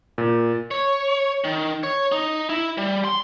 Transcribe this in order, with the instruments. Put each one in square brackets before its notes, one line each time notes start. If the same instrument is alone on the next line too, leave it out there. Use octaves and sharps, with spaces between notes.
[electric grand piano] A#2
[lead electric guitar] C#5
D#3
C#5
D#4
E4
G3
C6